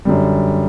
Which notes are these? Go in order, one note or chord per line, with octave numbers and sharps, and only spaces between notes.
F#2 D3 G3